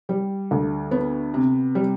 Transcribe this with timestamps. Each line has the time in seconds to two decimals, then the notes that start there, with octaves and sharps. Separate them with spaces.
0.09 G3
0.51 D2
0.91 B3
1.34 C3
1.75 G3